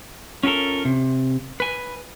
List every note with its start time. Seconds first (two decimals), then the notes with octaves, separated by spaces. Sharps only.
0.43 C#4 F4 G4 A4 A#4
0.85 C3
1.60 B4 G#5